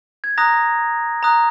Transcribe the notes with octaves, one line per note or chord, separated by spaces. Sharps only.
G#6
A#5 D#6 F#6 A#6
A#5 D#6 F#6